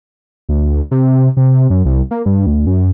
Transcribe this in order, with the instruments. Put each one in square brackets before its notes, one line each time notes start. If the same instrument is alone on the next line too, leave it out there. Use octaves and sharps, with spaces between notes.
[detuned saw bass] D2
C3
C3
F#2
C2
A#3
G2
D2
F#2